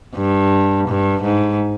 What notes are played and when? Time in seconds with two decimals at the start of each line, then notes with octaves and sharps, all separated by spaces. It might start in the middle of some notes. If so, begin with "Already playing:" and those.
0.16 G2
0.88 G2
1.23 G#2